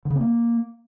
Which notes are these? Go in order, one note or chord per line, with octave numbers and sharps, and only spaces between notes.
D3
C#3
C4
A#3